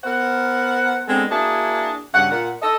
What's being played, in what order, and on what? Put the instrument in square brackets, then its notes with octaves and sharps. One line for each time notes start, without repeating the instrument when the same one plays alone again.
[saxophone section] B3 A#4 C5 F#5
G#3 B3 C4 D4 A4
A#3 D4 E4 F#4 G#4
G2 C#3 F#5
A#2 F#5
A4 D#5